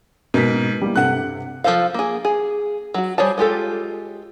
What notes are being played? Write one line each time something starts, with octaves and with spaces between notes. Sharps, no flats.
G#2 B2 A#3 B6
G3 A#3 E4
G2 C3 A4 F#5 F#6
F3 G#4 A4 C5 F5
A#3 G#4
G#4
F#3 F#4
G3 G#4 C5 C#5 A5
G#3 F4 G4 A4